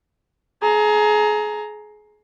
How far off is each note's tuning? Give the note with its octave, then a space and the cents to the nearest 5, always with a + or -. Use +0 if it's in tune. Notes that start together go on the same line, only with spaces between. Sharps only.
G#4 +30 A#5 +0